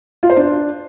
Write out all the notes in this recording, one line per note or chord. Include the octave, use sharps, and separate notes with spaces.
F4
C5
D4